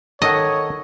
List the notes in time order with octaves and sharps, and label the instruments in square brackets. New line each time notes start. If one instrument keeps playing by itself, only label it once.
[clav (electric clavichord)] D#3 A4 F#5 [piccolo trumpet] C#5 [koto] D#5